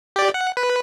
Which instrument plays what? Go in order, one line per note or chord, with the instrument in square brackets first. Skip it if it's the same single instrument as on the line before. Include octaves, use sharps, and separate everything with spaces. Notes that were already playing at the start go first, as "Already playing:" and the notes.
[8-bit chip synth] G4 D5
F#5
B4